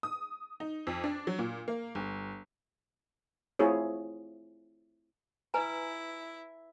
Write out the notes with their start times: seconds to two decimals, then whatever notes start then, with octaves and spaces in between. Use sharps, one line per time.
0.03 D#6
0.60 D#4
0.87 F2
1.04 D4
1.27 F#3
1.39 A#2
1.68 A#3
1.95 G1
3.59 A3 C4 E4 F4 G#4 C#5
5.54 E4 B4 G#5 A#5